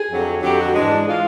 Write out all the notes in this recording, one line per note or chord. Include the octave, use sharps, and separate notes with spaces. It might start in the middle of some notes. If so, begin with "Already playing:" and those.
Already playing: G#4
F2 D3 F#3
F2 D3 F#3 G4
F#4
G#2 E3 G#3 D4
E3 G#3 F4